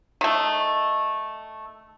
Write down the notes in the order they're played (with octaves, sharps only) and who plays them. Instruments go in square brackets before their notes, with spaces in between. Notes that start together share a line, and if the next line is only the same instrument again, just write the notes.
[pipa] D#3 A3